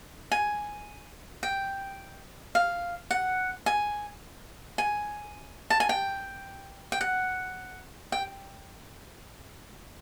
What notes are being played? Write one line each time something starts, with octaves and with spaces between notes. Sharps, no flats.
G#5
G5
F5
F#5
G#5
G#5
A5
G#5
G5
G5
F#5
G5